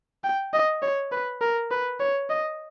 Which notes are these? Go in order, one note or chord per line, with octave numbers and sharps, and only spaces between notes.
G5
D#5
C#5
B4
A#4
B4
C#5
D#5